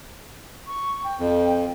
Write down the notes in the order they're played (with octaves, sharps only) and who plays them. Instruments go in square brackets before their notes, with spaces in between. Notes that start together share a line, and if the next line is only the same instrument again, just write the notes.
[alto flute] C#6
G5
[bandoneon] F2